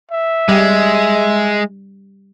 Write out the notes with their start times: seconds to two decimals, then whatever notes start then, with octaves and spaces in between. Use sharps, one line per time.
0.11 E5
0.49 G3 G#3